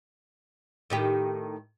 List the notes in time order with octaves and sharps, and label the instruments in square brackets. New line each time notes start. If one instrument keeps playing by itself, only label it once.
[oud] A2 D#3 G4